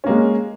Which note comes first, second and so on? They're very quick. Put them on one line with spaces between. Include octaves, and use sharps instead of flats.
C#4 A#3 G#3